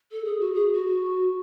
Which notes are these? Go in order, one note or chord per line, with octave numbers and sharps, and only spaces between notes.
A4
G#4
F#4
G#4
F#4